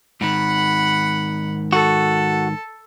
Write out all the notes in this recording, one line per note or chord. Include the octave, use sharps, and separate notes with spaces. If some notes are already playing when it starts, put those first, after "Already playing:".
G#2 D#3 F#5 B5
F#4 A4